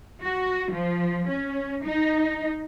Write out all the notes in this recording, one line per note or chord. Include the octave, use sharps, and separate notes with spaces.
F#4
F3
C#4
D#4